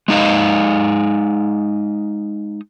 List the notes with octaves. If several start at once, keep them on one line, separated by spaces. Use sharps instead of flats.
G#3 D#4 D#5 F5